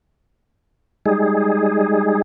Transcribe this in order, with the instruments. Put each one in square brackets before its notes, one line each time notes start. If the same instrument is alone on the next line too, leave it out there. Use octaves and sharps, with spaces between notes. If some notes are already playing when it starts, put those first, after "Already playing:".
[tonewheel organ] G3 G#3 D#4 G#4